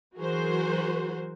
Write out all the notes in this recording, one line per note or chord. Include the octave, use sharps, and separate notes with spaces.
E3 F#3 F#4 G#4 A#4 C5